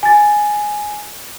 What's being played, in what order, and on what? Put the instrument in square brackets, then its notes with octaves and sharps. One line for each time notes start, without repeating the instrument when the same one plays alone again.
[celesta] G#5 A6